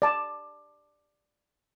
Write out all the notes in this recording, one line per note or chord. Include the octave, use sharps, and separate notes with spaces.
D5 A5